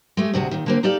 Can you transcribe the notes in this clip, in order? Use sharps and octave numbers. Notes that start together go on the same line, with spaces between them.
G#3 A3 G4
D2 C3 F#4 G#4
A#2 D#3
D3 A#3 C4
D#4 G4 A4 D5 F5